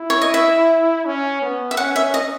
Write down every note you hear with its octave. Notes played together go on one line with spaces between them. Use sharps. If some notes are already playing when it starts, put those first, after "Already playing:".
Already playing: E4
C#5
D#5
E5
C#4
B3
E5
C#4 F#5
E5
D#5